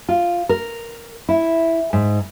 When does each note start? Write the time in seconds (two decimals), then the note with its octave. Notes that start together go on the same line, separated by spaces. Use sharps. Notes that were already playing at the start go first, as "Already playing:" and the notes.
0.09 F4
0.49 A#4
1.29 E4
1.93 G#2